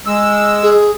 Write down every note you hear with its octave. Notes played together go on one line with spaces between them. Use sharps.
G#3 E6
G#4